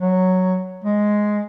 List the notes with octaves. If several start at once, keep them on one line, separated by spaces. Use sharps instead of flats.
F#3
G#3